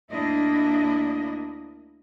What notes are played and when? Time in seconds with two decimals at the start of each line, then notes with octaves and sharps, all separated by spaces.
0.12 D2 A#3 D4 E4 D#5